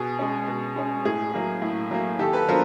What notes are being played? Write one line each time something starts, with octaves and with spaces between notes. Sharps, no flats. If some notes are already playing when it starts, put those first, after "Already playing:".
Already playing: B2 G#4
G#3 C#4
B2
G#3 C#4
A2 G#4
F#3 A#3
A2
F#3 A#3
D#3 G4 A4
A4 B4
F#3 B3 D4 F4 A#4 C5